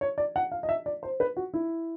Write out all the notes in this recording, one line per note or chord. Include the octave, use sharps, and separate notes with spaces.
C#5
D5
F#5
F5
D#5
E5
D5
C5
B4
F#4
E4